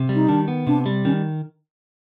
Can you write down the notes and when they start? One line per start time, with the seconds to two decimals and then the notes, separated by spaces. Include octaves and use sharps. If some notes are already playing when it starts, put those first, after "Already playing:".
Already playing: C3
0.09 G3
0.15 D#4
0.28 D#3 D4
0.48 B3
0.67 C3 D4
0.86 G3
1.05 D#3 C#4